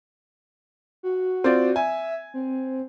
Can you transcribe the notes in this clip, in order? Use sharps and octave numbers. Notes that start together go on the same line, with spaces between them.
F#4
C4 F4 D5
E5 G#5
C4